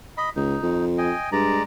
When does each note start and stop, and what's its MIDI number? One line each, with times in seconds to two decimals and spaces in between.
0.17 0.29 75
0.17 0.29 83
0.36 0.57 37
0.36 0.85 63
0.63 1.12 41
0.98 1.30 75
0.98 1.30 79
0.98 1.30 80
1.32 1.60 43
1.32 1.63 56
1.32 1.63 74
1.32 1.63 82